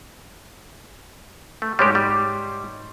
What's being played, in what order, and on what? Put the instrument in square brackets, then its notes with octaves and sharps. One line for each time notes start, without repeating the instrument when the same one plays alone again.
[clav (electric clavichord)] A3
[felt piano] G#2 C#5 C6 [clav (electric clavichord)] G3 G#3 G4
[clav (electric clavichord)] G3